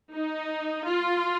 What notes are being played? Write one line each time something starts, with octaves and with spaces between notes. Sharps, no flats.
D#4
F4